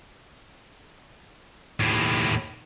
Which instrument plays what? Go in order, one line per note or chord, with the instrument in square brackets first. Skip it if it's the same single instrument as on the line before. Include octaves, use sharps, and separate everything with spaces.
[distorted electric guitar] D#2 A2